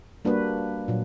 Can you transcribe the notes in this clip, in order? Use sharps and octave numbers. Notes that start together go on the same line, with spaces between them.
G3 A#3 D4 F#4 B4
A#2 F#3